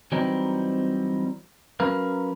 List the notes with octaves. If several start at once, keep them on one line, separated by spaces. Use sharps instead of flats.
E3 F#3 G3 C4 D#4
F#3 C#4 A#4 B4 F5